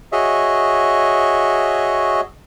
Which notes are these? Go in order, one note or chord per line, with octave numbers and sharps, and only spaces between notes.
F#4 G#4 C#5 D#5 E5